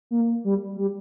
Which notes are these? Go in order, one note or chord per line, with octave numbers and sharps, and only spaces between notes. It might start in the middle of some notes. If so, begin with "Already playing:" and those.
A#3
G3
G3